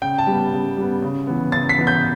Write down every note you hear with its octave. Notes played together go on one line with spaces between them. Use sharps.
C#3 G5
A5
G3 B3
C#3
G3 B3
C#3
E3 B3
C#3 A6
B6
E3 B3
G6